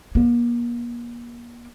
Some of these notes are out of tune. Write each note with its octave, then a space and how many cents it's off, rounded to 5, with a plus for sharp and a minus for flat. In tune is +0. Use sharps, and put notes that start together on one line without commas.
A#3 +40